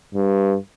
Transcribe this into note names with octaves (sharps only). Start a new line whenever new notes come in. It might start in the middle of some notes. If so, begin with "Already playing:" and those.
G2